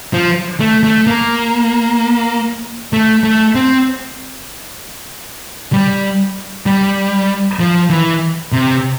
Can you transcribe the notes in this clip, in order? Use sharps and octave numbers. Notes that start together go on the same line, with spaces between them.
F3
A3
A3
A#3
A3
A3
C4
G3
G3
F3
E3
C3